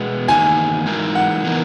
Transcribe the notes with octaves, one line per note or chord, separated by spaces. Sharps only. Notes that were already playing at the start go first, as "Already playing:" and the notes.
Already playing: B2 G#3 B3
E2 D#3 A#3 D#4 F#4 G#5
E3 G#3 D#4 A#4
F#5
E3 B3 D#4 A#4